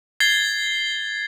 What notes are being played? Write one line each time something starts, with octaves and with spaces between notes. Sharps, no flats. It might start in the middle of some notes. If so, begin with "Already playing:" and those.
G#6 A6 C7 G7